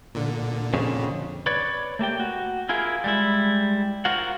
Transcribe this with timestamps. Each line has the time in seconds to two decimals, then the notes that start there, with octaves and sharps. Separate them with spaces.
0.15 A#2 D3
0.74 F2 C#3
1.46 B4 C#5 D5
1.99 A3 A#3 G4 G5
2.20 F#4
2.69 E4 F4 G#4 A#4
3.04 G3 G#3 E4
4.05 F4 F#4 A#4 C5 F#5